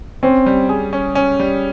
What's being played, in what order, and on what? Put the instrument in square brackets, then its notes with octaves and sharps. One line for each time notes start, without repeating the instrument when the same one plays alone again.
[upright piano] C4 [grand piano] C#4
[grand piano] G3
G#4
C#4
C#4
G3